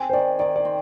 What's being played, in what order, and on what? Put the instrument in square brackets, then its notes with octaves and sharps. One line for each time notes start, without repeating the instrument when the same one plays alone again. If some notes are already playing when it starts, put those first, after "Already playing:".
Already playing: [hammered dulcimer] C4 [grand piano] G#5
[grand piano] C5
[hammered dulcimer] D#3 [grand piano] D5
[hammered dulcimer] D#3 [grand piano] D5
[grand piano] D5
[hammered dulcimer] C4